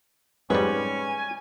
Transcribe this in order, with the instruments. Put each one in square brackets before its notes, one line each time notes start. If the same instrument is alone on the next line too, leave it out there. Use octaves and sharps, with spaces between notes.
[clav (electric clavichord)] G#2 G3 [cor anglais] C#4 [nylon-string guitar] B4 [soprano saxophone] G#5